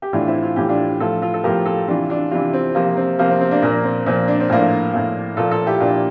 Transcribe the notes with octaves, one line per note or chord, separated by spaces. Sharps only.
G4
A2 E3 D4 F4
C4 E4
F4
A2 E3 G4
D4 F4
A2 F3 F4 A4
F4 A4
A4
A2 F3 G4 A#4
F4 A4
C3 E3 D4 F4
D4 F4
C3 E3 D4 F4
C4
C3 F3 A#3
C4
C3 F3 A#3
C4
C4
A#3 D4
A#2 F3 A#3
C4
A#2 F3 C4
D4
C4
A2 F3 A#3 D4
A2 F3
A#2 F3 F4 A4
F4 A4
E4 G4
A#2 F3 D4 F4